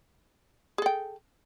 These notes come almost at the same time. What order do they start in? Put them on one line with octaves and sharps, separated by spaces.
G#4 A4 G5